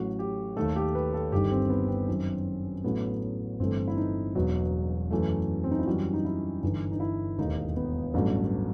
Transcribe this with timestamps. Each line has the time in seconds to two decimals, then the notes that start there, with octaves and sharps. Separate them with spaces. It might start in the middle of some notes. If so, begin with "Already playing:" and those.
Already playing: A1 A2 F#3 A3 F#4
0.19 G4
0.57 D#2 D#3 A3 A4
0.76 G4
0.95 B4
1.14 A4
1.32 G1 G2 D#3 G4
1.52 C4
1.69 B3
1.88 C4
2.08 F#2 D#3 F#3
2.84 A1 A2 F#3 A3 B3
3.59 G1 G2 E3 A3 C4
3.88 E4
3.97 D#4
4.35 E1 E2 B2 F#3
5.11 F#2 E3 A3
5.64 C4
5.71 D#4
5.79 E4
5.86 F#2 E3 G3 F#4
6.13 D#4
6.25 E4
6.62 G1 G2 E3 D#4
6.92 D#4
7.00 E4
7.38 E1 D#2 D#3 A3 D#4
7.76 B3
8.14 A1 G2 F#3 A3